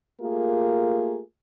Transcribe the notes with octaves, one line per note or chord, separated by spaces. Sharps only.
A3 A#3 F4 G4 G#4 A#4